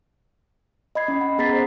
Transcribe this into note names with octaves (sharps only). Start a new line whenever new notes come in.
D#5 B5 G#6 C7
C#4 B5
F#5
B3 G#4 A#5 A6 B6 C7
C5 D#5